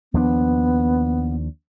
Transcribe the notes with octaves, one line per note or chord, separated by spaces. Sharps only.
D#2 F3 B3 D4